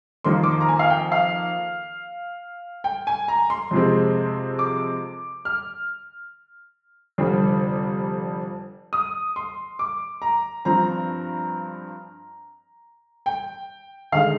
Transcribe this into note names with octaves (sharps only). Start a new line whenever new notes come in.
F2 D#3 A#3 C6
D6
C6
A#5
G#5
F5
G5
F5
G5
G#5
A#5
C6
F2 C3 F3 G#3 C4
D6
F6
F1 F2 D3 G3
D#6
C6
D6
A#5
G2 F3 C4 A#5
G5
D#2 D3 G#3 F5